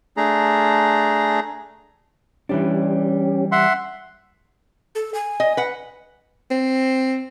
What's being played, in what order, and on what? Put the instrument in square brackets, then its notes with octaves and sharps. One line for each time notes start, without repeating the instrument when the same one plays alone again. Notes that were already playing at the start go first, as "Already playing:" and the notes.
[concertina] A3 D4 G#4 A#5
[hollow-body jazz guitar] E3 G3 D4 [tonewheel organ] C#4 G4
[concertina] E5 F#5 C6
[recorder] A4
G#5
[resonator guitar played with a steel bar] D#5
B4 F#5
[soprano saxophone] C4